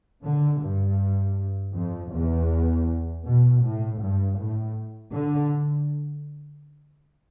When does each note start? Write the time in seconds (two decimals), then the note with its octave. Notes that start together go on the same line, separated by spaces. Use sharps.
0.24 D3
0.62 G2
1.74 F2
2.12 E2
3.24 B2
3.62 A2
4.00 G2
4.38 A2
5.13 D3